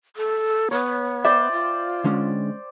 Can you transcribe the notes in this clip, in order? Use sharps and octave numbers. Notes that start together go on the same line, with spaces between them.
A4
B3 C#5
C5 D5 E5 G5
F4
D3 G#3 C#4